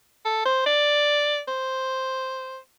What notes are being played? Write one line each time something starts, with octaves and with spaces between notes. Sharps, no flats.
A4
C5
D5
C5